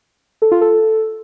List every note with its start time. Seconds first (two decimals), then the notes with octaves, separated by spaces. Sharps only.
0.42 A4
0.52 F4
0.61 A4